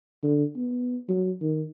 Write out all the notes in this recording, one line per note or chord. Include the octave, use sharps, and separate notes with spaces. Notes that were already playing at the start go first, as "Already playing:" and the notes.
D3
B3
F#3
D#3